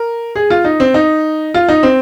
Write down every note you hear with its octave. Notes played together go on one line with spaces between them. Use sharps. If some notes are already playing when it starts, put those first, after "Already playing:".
Already playing: A#4
G#4
F4
D#4
C4
D#4
F4
D#4
C4